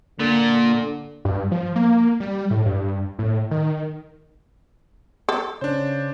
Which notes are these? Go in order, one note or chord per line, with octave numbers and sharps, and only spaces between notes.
A#2 D3
G2
F3
A#3
G3
A2
G2
A2
D#3
A4
C#3 D4 C5 C#5